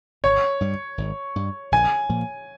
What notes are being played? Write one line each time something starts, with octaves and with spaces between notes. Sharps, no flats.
G#1 C#5
G2 G3
G#1
G2 G3
A#1 G#5
A#2 F3 A#3